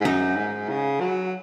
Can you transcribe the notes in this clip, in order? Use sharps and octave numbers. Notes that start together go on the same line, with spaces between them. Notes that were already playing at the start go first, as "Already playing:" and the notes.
G#2
F#2 D#4
G#2
C#3
F#3